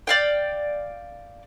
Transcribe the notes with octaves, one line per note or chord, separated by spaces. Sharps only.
D5 F5 G5